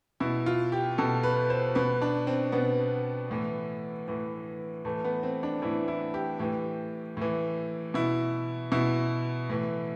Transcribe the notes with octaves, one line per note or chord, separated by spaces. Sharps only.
B2 E4
F4
G4
B2 A4
B4
C5
B2 B4
D4
C4
B2 B3
A2 E3
A2 E3
A2 E3 A3
B3
C4
D4
A2 E3 E4
E4
G4
A2 E3 G4
A2 E3
B2 E4
B2 E4
A2 E3